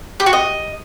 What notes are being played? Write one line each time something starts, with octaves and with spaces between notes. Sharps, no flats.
G4
F#4
D#5